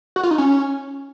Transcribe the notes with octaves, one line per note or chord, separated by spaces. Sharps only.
F#4
F4
D#4
C#4